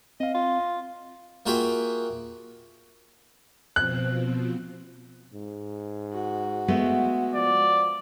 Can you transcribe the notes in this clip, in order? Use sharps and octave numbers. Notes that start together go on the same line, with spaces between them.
C4 D#5 F5
F4
A#3 F4 F#4 G#4 E5 G5
B2 F3 C4 F#6
G#2
F#4
G#3 A3 B3
F3 D5